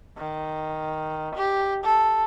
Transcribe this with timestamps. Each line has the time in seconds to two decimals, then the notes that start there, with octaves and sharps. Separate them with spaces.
0.18 D#3
1.35 G4
1.84 A4